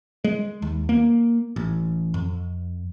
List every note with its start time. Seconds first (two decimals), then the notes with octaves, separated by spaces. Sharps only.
0.24 G#3
0.62 D#2
0.89 A#3
1.56 A1
2.14 F2